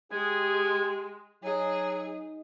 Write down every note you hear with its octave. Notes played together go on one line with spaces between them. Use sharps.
G#3 G4 G#4
F#3 D#4 G#4